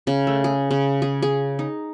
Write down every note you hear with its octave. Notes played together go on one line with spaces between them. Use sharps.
C#3
A3
G#4
C#3
G#4
G#4
D#4